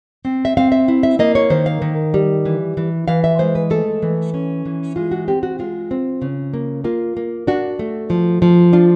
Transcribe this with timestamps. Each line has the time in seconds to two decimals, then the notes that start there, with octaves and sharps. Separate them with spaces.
0.25 C4
0.45 E5
0.57 C4 F5
0.72 E5
0.88 E4
1.03 E5
1.19 A#3 D#5
1.35 C#5
1.50 D#3 C5
1.66 F5
1.82 D#3
2.14 G3
2.45 E3
2.77 E3
3.08 E3 F5
3.24 E5
3.39 G#3 C5
3.55 B4
3.70 A3 A4
4.02 E3
4.34 C#4
4.65 E3
4.96 G#3 F4
5.11 F#4
5.28 C4 G4
5.43 F#4
5.59 G#3 F4
5.91 C4
6.22 C#3
6.53 A#3
6.84 A#3 F4
7.17 A#3
7.47 D4 F#4
7.79 A3
8.10 F3
8.42 F3
8.73 D4 F4